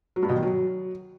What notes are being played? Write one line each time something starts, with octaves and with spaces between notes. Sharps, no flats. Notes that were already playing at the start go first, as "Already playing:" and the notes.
F#3
G2
B2
D#3
F#3